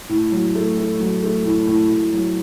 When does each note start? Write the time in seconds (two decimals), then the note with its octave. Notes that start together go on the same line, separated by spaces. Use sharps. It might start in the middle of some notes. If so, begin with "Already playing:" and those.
0.09 A2
0.32 F#3
0.55 A3
0.78 A3
1.00 F#3
1.23 A3
1.44 A2
1.67 A2
1.89 A2
2.12 F#3